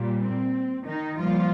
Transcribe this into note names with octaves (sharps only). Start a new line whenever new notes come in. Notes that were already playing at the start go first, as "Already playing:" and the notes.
Already playing: A#2 G3
C4
D#3 D#4
A#2 F3 G3 F4